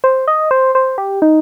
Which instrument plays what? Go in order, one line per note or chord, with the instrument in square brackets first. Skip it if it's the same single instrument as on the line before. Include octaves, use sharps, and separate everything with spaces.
[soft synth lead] C5
D#5
C5
C5
G4
D#4